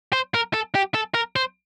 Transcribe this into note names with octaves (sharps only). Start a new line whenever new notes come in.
C5
A#4
A4
G4
A4
A#4
C5